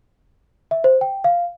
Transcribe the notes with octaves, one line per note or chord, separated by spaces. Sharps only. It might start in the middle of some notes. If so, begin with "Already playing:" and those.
E5
C5
G5
F5